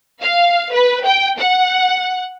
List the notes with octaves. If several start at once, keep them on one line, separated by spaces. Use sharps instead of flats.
F5
B4
G5
F#5